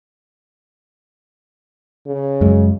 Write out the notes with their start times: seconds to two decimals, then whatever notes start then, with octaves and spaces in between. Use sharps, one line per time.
2.07 C#3
2.41 F#2 G#3